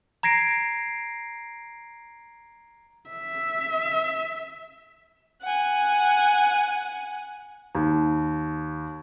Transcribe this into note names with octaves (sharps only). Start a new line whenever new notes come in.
A#5 G#6 A#6 C7 D7
E5
F#5 G#5
D#2